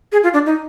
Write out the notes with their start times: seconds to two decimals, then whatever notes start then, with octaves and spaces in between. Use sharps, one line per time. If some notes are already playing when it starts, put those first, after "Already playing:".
0.12 G#4
0.23 F4
0.34 D4
0.46 D#4